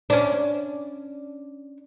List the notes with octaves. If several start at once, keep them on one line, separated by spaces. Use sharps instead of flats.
C#4 D4